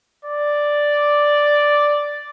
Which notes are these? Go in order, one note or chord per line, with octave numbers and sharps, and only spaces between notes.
D5